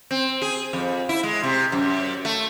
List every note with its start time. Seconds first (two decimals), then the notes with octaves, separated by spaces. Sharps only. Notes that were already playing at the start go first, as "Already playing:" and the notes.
0.11 C4
0.42 G#4
0.73 F2
1.09 E4
1.23 G#3
1.43 C3
1.72 F#2
2.25 A3